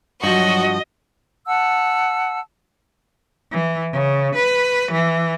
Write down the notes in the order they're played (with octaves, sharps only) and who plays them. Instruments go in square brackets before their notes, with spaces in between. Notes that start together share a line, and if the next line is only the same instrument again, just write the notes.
[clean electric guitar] G2 F3 [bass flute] F#3 [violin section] F#4 [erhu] D#5
[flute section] F#5 A5 E6
[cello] E3
C#3
B4
E3